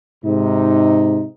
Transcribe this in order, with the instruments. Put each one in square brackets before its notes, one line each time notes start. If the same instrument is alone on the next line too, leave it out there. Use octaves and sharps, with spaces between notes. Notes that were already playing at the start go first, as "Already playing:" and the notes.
[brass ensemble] G#2 C3 D#4